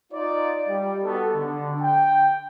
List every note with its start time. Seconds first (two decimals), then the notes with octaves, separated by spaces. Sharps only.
0.13 D#4 F4 D5
0.69 G3
1.04 B3 D#4 F#4 G4 A4
1.35 D3
1.82 G5